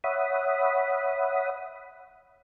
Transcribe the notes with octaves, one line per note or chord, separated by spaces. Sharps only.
C#5 E5 F#5 B5 D#6